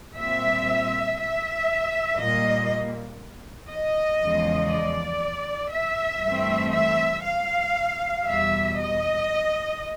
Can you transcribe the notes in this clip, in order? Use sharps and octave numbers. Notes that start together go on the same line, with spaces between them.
A#2 G3 C4 E5
E5
A#2 G3 A#3 D#5
D#5
E2 C#3 F3 G#3
D5
E5
G2 E3 A3 C4
E5
F5
E2 B2 G3 E5
D#5